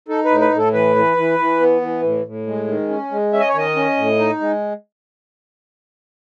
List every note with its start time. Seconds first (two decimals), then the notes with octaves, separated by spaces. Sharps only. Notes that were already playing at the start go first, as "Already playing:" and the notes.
0.09 D#4 A4
0.25 B4
0.30 A2
0.41 B4
0.52 A2 A4
0.73 E3 B4
0.96 E3
1.17 E3
1.39 E3
1.60 B3
1.81 E3
2.03 A2
2.25 A2
2.47 G#3
2.67 D#3
2.89 C#4
3.11 G#3
3.33 C#4 E5
3.40 D#5
3.49 C#5
3.54 D#3 D#5
3.76 C#4
3.97 A2
4.19 D#4
4.40 G#3